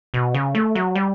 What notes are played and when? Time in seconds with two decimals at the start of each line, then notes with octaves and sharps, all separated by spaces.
0.14 B2
0.34 C#3
0.55 A3
0.75 F#3
0.95 G3